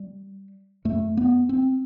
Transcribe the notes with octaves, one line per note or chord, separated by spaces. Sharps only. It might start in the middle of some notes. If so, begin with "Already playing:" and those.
Already playing: G3
F#2 A3
B3
C4